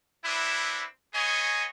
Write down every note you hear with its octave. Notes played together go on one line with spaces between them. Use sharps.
B3 C4 D4 E4
B3 F#4 G#4 C#5 D#5 G#5